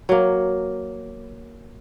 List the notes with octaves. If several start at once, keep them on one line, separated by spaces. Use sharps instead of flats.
F#3 A#3